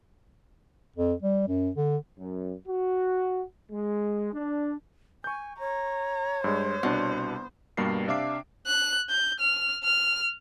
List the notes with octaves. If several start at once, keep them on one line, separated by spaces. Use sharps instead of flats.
F2
G3
F#2
D3
F#2
F#4
G#3
D4
G#5 C#6 G6
C#5 A#5
G2 G#3 C5
C2 B2 D4
G2 B2 G3 A#3 C7
C3 D4 E5 F5 D6 C7
F#6
G6
F6
F6